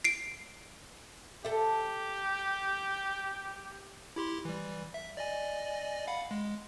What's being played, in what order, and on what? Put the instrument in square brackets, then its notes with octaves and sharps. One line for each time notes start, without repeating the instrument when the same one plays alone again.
[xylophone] C7 D7
[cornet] G4 [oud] A4 E5
[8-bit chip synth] E4 G4 C6
E3 G3
E5
D5 D#5 G#5
F5 F#5 B5
G#3